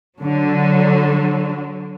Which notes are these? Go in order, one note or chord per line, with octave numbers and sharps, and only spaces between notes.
D3 F#3